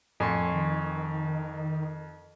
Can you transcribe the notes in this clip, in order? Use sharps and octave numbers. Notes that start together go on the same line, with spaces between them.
F2 A2 G#5 C6 C#6
D#3